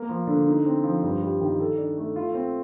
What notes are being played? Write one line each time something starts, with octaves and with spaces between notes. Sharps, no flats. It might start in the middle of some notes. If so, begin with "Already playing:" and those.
Already playing: A#3
F3
D3
D#4
C4
F3
G2
G3
D#3
A4
D4
A3
F4
C4